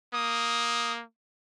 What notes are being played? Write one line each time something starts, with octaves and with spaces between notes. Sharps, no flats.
A#3 D#6